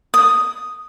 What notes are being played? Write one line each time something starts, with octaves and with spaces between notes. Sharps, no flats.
D#6